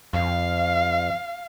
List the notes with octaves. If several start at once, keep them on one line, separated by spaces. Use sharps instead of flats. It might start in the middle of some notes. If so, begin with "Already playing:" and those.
F2 F5